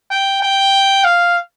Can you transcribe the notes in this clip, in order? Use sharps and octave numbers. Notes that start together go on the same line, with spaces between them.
G5
G5
F5